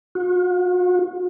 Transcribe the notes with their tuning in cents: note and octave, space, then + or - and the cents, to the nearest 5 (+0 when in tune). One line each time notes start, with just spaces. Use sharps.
F#4 -45